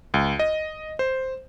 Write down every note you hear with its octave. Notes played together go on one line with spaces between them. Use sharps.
C#2
D#5
C5